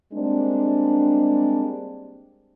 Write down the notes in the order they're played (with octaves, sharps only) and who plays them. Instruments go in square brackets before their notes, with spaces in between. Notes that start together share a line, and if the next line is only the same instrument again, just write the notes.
[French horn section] G3 G#3 A#3 C4 D4